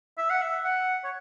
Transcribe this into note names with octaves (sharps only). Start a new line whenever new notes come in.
E5
F#5
E5
F#5
C#5